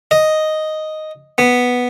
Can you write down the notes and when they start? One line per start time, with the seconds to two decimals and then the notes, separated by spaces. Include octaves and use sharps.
0.11 D#5
1.38 B3